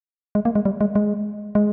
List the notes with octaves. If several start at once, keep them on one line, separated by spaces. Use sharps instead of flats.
G#3
A#3
G#3
G3
G#3
G#3
G#3